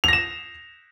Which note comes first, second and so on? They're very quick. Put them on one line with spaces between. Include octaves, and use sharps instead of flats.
F7 A#6 E7